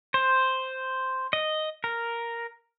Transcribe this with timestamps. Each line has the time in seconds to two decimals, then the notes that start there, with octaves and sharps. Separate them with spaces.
0.14 C5
1.33 D#5
1.84 A#4